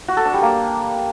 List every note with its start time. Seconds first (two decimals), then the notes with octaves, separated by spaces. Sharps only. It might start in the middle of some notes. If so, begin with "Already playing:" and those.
0.08 F#4
0.17 A4
0.25 D4
0.34 G3
0.42 A#3